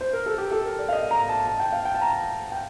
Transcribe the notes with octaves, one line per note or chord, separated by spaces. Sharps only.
C5
A#4
A4
G4
A4
A#4
D5
F5
D#5
A#5
A5
A5
G5
F5
G5
A5
A#5
G5